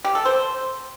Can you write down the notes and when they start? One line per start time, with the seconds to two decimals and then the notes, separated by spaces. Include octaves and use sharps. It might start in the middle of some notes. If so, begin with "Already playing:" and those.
0.04 G4
0.15 A4
0.25 C5